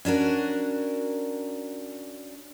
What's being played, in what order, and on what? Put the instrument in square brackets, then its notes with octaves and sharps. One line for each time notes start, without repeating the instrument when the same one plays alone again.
[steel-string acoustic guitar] C#4 D4 F#4 A#4